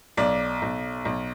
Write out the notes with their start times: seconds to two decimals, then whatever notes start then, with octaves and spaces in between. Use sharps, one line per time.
0.17 B1 D5
0.62 B1
1.05 B1